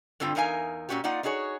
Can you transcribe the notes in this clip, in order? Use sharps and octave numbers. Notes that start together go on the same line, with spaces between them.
G2 D3 C4 F4 G5
E2 D#4 A#4 F5 G#5
A#2 C#3 C#4 F#4 G4
A#3 D#4 F4 D5 F#5
D4 D#4 F#4 G#4 C#5